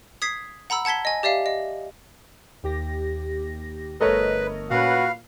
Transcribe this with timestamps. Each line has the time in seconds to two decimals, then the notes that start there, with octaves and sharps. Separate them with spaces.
0.22 D#6 G#6 B6 C7
0.70 F#5 A#5 B5 E6
0.85 F#5 A5 G#6 B6 G7
1.05 D#5 G#5
1.23 G4 D5 E5 F5
1.46 D#5
2.63 D#2 G4 A#6
4.01 G1 A3 A#4 B4 C#5 D#5
4.71 A#2 C#4 F#4 B4 F5